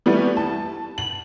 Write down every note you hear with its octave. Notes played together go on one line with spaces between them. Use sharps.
E3 G3 A3 B3
A5
F#7